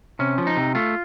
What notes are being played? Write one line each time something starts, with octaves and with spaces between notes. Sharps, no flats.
C3 C#4
F3
D#4
C3
A3 F4